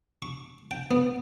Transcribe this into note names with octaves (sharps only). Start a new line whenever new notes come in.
C#6
G5
B3